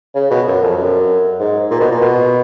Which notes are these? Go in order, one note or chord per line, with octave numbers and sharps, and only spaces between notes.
C#3
B2
F#2
F2
F#2
G#2
A#2
B2
A#2
B2